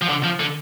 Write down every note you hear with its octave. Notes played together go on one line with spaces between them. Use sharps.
F3
D3
F3
D3